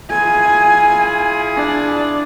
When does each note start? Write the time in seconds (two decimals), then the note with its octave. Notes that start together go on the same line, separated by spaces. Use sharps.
0.10 E4 F4 G#4 G#5
1.57 D4